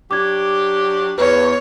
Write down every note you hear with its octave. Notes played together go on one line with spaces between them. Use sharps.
F#3 D4 G4 D6 G#6
E2 B4 C#5